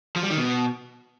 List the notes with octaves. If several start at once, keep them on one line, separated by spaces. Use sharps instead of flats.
F3
G3
D#3
B2